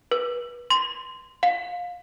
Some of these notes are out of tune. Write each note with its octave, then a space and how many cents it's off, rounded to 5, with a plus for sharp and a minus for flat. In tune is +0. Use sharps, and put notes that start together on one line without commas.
B4 -30
C6 -15
F5 +25